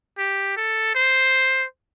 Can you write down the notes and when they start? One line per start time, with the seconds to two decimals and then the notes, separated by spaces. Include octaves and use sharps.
0.18 G4
0.57 A4
0.95 C5